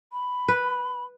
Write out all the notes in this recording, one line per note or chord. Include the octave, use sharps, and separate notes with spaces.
B5
B4